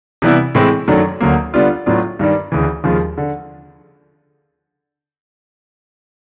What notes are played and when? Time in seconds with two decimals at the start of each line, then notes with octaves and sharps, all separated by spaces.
0.22 C3 E3 G3 B3 E4
0.55 A2 E3 G#3 C4 E4
0.88 F#2 D#3 F#3 A3 D4
1.21 D2 D3 F#3 A#3
1.54 D3 G3 B3 D4 F4
1.86 A2 F#3 B3 D4 F4
2.19 G2 D#3 G3
2.52 D2 C#3 E3
2.84 D#2 C#3 F3 G#3
3.18 D3